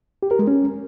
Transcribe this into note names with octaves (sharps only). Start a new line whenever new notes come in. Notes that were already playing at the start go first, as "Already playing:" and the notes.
G4
A#4
G#3
C#4